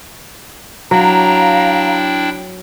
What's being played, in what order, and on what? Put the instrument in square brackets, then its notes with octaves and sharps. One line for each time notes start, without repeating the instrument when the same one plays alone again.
[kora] F#3 [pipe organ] D4 E4 G5 [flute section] F5 A#5